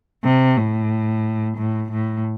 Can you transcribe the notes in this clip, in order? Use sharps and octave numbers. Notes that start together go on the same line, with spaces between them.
C3
A2
A2
A2